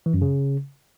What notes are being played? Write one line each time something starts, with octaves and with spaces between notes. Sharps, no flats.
E3
F#2
C#3